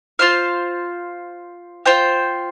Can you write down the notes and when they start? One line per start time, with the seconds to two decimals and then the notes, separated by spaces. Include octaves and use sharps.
0.19 F4 C5 F5
1.86 F4 C5 G5